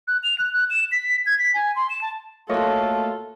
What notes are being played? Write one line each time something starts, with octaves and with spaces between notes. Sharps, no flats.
F#6
F7
F#6
F#6
E7
B6
G#6
B6
G#5
C6
E7
A5
A3 A#3 F4 F#4 A4 C#5 D#5